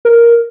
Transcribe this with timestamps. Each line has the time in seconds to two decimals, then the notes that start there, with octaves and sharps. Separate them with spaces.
0.05 A#4